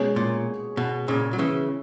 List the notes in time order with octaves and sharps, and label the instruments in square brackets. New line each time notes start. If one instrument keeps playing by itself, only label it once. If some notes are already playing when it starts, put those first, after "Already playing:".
Already playing: [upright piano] B2 G#3 C#4 G#4 C#5
[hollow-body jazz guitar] A#2
B2
A#2 C#3
F#3
C#3 E3